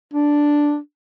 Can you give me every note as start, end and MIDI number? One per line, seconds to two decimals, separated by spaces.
0.14 0.77 62